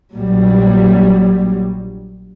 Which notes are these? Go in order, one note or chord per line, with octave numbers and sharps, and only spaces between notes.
A#1 A#2 F#3 G3